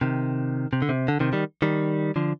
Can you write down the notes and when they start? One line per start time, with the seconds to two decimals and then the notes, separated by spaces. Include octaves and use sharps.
0.01 C3 D#3
0.73 C3
0.82 D3
0.89 C3
1.08 D3
1.20 C3 D#3
1.33 D#3 G3
1.62 D#3 G3
2.16 D3 F3